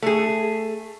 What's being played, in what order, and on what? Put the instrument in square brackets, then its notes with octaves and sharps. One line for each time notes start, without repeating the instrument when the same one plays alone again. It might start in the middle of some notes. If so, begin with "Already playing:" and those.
[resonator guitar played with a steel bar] A3 G#4